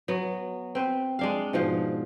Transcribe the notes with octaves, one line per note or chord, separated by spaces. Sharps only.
F#3 B3
C4 B4
G#3 D4 F5
G#2 B2 F3